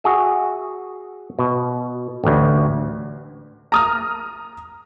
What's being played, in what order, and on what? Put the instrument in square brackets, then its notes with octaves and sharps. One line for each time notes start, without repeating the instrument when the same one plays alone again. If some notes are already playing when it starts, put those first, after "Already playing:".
[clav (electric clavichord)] F#4 G#4 E5
B2
A1 D2
[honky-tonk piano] A#5 D#6 F6